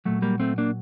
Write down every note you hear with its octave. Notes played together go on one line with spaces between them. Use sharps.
A#2 F#3 A3
G3 A#3
A3 C4
A#3 D4